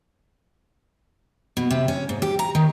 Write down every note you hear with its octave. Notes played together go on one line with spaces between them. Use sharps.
B2
C3
C#4
G#2
G4
A#5
D#3